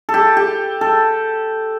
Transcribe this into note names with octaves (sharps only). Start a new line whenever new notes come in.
A4
G4
G4
A4